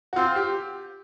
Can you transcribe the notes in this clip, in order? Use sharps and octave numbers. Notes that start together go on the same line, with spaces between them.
F#4
C4 F4
G4